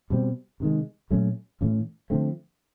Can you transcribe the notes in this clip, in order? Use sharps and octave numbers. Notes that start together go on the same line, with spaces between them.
B2 G3 C4
C3 D#3 G#3
A#2 F#3 A3 C#4
A2 E3 A3 C#4
D3 F3 A3 C4